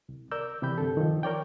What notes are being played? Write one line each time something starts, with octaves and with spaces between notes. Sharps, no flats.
C2
A#4 D5 E6 G6
C3 E3 G4 B5 G6
G2 D3 A4
D#3 F3
A#4 C#5 D5 G5